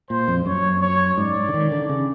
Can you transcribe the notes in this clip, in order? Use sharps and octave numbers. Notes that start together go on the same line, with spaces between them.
A#2 C5
F2
F#2 C#5
C#5
G#2 D5
D3
D#3
D3
C#3